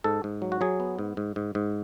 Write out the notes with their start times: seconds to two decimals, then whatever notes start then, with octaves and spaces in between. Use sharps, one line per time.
0.04 G#2 A4
0.24 G#2
0.42 F#3
0.52 F#4
0.61 F#3 G#4
0.80 B3
0.99 G#2
1.17 G#2
1.36 G#2
1.55 G#2